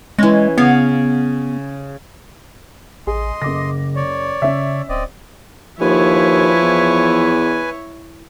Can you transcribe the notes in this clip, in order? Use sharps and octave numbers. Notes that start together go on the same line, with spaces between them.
E3 G#3 C#4
C#3 B3 C#5 F5
A1 G#4 D#5 C6
F#1 C#3 D6 A#6
C#5 D5
C#3 C#4 E5
D1 C4 D5 D#5
D#2 F3 E4 B4 C#5 G#5
E2